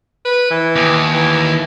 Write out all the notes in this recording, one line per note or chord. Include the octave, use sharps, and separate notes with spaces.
B4
E3
D#2
E3